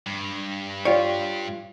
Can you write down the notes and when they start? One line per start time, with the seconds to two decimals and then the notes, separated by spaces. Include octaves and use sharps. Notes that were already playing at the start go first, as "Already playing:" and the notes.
0.06 G2
0.85 F4 G4 C#5 D5